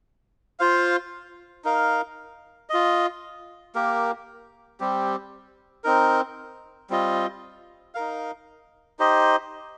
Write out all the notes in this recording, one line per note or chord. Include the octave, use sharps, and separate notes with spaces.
F4 C5 F5
D#4 A#4 F5
F4 D#5
A#3 G4 A#4
G3 C4 G4
C4 D#4 A#4
G3 C4 F4 D#5
D#4 A#4 F5
D#4 G4 C5 D#5